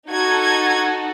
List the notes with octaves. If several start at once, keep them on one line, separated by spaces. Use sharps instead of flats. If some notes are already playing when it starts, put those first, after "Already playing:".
D#4 F#4 A4 G#6
G#6